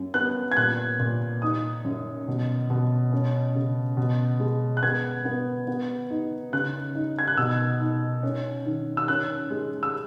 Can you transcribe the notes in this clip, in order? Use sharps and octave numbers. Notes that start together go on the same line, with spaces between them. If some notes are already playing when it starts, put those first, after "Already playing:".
Already playing: F#2
B3 F#6
G#6
A#2 F#6
A#2
D#4 D#6
F#2
B2
B2
C#4
C#3
B2
G#3
F#6
B3 G#6
B3
B3
D#4
C#3 F#6
D#4
G#6
F#6
B2 E6
D#4
C#4
D#3
E6
C#4 F#6
G#3
E6